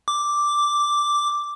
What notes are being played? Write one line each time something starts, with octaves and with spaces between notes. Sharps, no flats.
D6